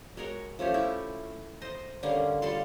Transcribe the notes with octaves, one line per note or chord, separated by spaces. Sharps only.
G#3 F#4 A#4 C#5
F3 A3 C#4 G4
E4 C#6
C5 D#5 C6
D3 G3 A#3 C#4
G3 F4 A4 C6